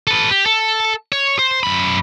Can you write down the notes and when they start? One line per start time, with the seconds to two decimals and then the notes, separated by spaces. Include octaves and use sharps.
0.07 A4 B4
0.31 G4
0.46 A4
1.12 C#5
1.39 C5
1.63 F#2 B5